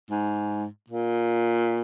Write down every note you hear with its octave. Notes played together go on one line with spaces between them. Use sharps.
G#2
A#2